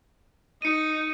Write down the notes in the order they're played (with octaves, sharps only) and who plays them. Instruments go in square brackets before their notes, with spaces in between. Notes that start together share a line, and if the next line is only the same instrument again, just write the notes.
[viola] D#4 [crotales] C#7 D#7